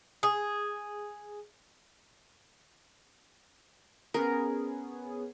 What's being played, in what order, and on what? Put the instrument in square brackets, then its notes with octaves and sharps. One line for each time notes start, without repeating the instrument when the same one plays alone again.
[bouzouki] G#4
[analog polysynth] B3 C#4 G#4 [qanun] A#4